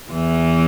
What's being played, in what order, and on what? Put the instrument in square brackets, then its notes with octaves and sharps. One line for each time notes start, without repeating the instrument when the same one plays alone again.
[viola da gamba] E2 E3